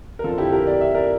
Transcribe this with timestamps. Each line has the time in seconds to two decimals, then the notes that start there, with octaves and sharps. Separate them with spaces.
0.19 A#4
0.24 F2 D3 F3 F4 A4
0.38 E4 G4
0.52 G4 A#4
0.67 D5
0.81 E5
0.95 A#4 D5